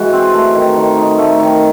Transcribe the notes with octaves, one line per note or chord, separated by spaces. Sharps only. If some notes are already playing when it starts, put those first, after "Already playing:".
Already playing: E3 G#3 F#4
C4
A3
D#3
D#3
D#4
A3
D#3